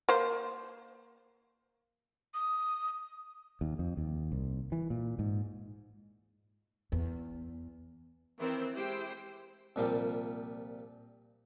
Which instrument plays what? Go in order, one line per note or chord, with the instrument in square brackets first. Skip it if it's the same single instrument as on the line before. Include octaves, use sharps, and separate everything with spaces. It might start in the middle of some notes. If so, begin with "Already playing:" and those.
[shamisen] A#3 C5
[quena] D#6
[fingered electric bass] D#2
F2
D#2
C2
E3
A#2
G#2
[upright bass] E2
[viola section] D#3 E3 C4
G#3 E4 G4 C5 G5
[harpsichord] C2 A#2 F3 G3